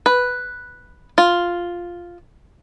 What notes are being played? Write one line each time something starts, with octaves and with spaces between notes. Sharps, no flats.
B4
F4